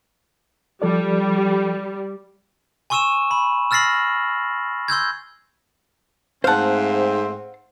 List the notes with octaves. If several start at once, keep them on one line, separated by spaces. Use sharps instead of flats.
F3 G3 A4 D5
G#5 C6 C#6 E6 D#7 E7
B5
E6 F6 A6 A#6 C7 F#7
C6 E6 G6 G#6
G#2 A3 C4 C5 F5 F#5 A5